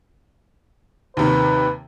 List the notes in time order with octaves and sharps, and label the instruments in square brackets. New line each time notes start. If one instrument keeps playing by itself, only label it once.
[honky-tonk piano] D#2 C3 D#3 [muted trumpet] B4